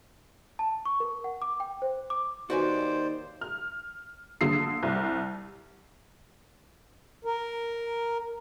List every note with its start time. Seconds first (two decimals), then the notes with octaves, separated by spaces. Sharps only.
0.59 A5
0.85 C#6
1.00 A#4
1.24 F#5
1.42 D6
1.60 G5
1.82 C5
2.10 D6
2.50 D#2 F#4 B4 C5 D5 G#5
3.41 F6
4.41 D3 A#3 D#6 E6 C7
4.83 C2
7.25 A#4